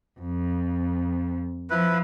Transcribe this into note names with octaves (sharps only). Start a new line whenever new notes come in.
F2
F3 E4 B4